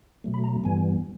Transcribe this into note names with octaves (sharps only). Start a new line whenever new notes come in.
B2 F#3 A3
B5
A#5
G2 E3 G3 B3 G#5